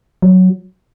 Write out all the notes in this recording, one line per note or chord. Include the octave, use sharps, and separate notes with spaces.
F#3